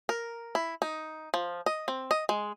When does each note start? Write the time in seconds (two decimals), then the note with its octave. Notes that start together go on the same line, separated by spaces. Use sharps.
0.09 A#4
0.55 E4
0.82 D#4
1.34 F3
1.66 D#5
1.88 C4
2.11 D#5
2.29 G#3